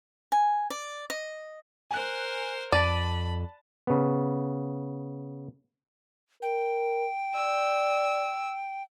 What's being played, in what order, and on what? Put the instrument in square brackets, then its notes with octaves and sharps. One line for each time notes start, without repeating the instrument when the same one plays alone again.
[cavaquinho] G#5
D5
D#5
[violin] A#4 C5 [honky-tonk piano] G#5 F#6
[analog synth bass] F2 [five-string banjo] D5 [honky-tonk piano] A5 A6 D#7 [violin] B5
[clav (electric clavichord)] C#3 B3
[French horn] A#4 [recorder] G5
[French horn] D5 [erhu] E6